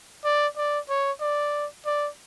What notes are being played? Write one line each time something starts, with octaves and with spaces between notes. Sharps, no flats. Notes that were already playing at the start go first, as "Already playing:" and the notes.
D5
D5
C#5
D5
D5